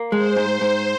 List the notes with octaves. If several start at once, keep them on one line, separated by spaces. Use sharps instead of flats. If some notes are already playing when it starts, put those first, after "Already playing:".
Already playing: A#3
G#3 C5
G#2
G#2